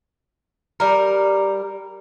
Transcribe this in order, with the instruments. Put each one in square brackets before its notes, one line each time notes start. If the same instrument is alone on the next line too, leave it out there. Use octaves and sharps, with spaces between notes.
[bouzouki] G3 A#4